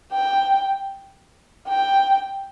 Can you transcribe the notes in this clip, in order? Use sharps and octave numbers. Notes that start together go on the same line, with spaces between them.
G5
G5